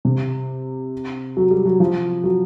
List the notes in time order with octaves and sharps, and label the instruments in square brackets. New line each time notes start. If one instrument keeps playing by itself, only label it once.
[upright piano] C3
F#3
G3
F#3
F3
F#3